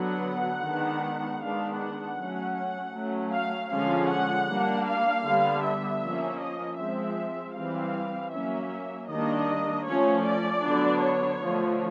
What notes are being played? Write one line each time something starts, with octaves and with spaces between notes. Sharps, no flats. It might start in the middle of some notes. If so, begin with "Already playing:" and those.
Already playing: D3 F#3 B3 F#5
D#3 G#3 B3 D4
D#3 G#3 B3 D4 F5
F#5
F#3 A3 C#4
F#3 A3 C#4
F5
D3 F3 G#3 C#4 F5
F#5
G3 A#3 D4
F5
D3 G3 B3
E5
F3 A#3 C#4
D#5
F3 G#3 C4 E5
E3 G3 C4 F5
F#3 A#3 C#4 E5
D#3 G3 A#3 D4 D#5
F3 A3 C#4 C#5
D5
D3 F#3 B3 D4
C#5
D3 F3 A3